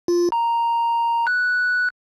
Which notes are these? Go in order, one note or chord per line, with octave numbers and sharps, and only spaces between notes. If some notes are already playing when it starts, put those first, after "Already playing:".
F4
A#5
F#6